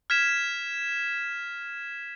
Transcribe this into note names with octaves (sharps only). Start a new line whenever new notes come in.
F6 G#6 B6 E7